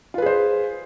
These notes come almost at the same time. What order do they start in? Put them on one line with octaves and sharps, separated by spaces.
F4 B4 G#4 C5